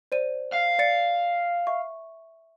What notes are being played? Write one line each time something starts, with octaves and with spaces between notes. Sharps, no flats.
C5 D5 D#7
F5
D5 A6 C#7
E5 C#6